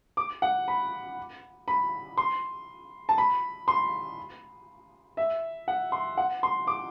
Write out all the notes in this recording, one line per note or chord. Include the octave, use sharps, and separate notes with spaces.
D6
F#5
B5
B5
C6
A5
B5
C6
E5
F#5
C6
F#5
C6
D6